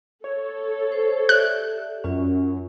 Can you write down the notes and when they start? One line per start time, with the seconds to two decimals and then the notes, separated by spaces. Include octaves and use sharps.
0.24 A4 C#5
0.92 C5
1.29 G4 D5 E5 F#6
2.04 F#2 C#4 F4